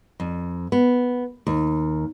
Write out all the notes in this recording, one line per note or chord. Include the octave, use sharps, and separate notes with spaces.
F2
B3
D#2